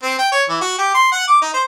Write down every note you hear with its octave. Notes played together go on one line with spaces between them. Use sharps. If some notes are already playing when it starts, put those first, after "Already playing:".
C4
G5
C#5
E3
F#4
G4
C6
F#5
D6
D#4
C5